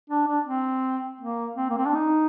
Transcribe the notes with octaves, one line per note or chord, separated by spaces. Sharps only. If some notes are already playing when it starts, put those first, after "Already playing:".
D4
D4
C4
A#3
C4
A#3
C4
D4
D#4